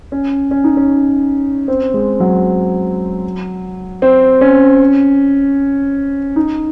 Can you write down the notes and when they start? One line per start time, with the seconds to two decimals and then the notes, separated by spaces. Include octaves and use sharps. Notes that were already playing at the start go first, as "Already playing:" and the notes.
0.12 C#4
0.51 C#4
0.64 D#4
0.77 C#4
1.68 C4
1.94 G#3
2.20 F#3
4.02 C4
4.41 C#4
6.36 D#4